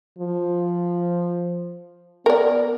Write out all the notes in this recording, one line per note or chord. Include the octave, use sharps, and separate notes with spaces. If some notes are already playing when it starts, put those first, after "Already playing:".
F3
B3 A#4 D5